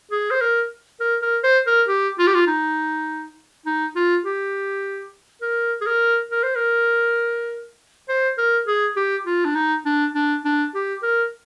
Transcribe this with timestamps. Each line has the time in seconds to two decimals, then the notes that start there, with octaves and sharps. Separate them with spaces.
0.11 G#4
0.31 C5
0.41 A#4
1.00 A#4
1.22 A#4
1.43 C5
1.67 A#4
1.88 G4
2.18 F4
2.27 G4
2.34 F4
2.47 D#4
3.66 D#4
3.96 F4
4.24 G4
5.42 A#4
5.81 G#4
5.87 A#4
6.31 A#4
6.43 C5
6.56 A#4
8.09 C5
8.38 A#4
8.67 G#4
8.96 G4
9.26 F4
9.45 D4
9.55 D#4
9.85 D4
10.15 D4
10.45 D4
10.74 G4
11.03 A#4